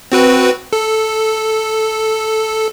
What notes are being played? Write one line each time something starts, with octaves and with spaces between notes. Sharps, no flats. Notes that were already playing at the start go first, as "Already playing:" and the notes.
C4 F#4 B4
A4